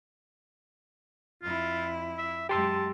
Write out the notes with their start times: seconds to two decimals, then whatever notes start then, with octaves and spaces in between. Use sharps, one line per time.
1.43 F2 E4 F4
2.18 E5
2.49 F#2 G#3 G4 A5 C6 E6